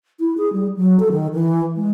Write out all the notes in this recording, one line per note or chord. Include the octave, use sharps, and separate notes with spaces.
E4
G#4
G3
F#3
A4
D#3
E3
G#3